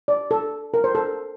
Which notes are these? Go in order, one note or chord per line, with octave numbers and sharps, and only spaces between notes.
D5
A4
A#4
C5
A4